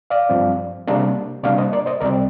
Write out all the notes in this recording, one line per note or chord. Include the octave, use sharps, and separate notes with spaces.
D5 F5
G2 F3 C4
C3 G3 A#3 D4
C3 G3 A#3 D4 D5 F5
C5 D#5
A#4 D5
C5 D#5
C2 C3 G3 C4 A#4 D5